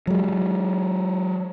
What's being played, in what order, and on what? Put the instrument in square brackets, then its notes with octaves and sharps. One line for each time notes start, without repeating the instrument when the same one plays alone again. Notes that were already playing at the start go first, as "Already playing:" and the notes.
[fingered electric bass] F#3 G#3